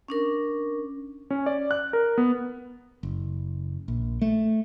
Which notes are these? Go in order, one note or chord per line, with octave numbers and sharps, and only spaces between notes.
C#4 D4 A#4
C#4
D5
F#6
A#4
B3
F#1
A#1
A3